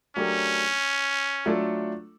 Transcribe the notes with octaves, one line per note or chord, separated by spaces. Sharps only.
F#3 A3 C#4 D4 G4 A#4
F#3 A3 D4 F4 A4